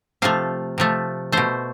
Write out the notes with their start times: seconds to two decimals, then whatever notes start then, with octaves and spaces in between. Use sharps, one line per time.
0.22 C3 F3 A3 F5
0.78 C3 F3 A3
1.32 B2 A3 C5